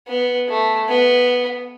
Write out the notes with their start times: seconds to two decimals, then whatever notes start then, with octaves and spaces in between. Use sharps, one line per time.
0.08 B3
0.49 A3
0.89 B3